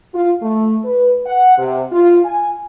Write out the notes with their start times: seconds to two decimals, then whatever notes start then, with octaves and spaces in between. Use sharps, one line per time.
0.13 F4
0.42 A3
0.84 B4
1.26 F#5
1.57 C3
1.91 F4
2.24 G#5